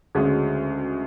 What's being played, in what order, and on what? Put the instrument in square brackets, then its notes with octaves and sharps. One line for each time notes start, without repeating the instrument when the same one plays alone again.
[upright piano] D2 C#3 G#3 C#4 F#4